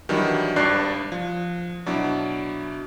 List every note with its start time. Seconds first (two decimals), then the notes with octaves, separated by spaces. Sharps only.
0.09 D#3 E3 F#3 G3 D4
0.56 G#1 G2 D4 D5 F#6 C7
1.12 F3
1.86 B2 F#3 D4 E4